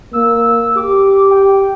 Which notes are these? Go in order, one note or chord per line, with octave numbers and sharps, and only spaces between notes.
A#3 E6
G4 D6
G5